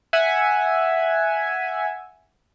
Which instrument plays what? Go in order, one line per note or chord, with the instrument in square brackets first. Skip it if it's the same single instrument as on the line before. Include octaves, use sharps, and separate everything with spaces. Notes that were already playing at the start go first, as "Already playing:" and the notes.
[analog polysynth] E5 F#5 G#5